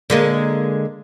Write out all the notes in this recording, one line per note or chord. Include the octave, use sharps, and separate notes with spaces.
D3 G#3 A#3